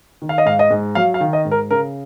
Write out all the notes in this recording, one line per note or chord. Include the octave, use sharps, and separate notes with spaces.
D#3
F5
D#5
G#2 F5
D#5
G#2
F#3 F5
F5
D#3
D#5
G#2
A#4
C#3 A#4